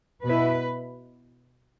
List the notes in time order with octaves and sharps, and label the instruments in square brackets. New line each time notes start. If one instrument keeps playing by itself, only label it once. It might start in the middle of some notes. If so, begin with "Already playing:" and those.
[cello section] B2 B3 E4 B4